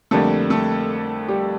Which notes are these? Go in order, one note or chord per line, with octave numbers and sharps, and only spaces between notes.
F2 D3 G3 A3 A#3 A4
A3 A4
G3 G4